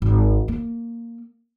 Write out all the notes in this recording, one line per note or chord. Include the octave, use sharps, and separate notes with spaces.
G#1
A#3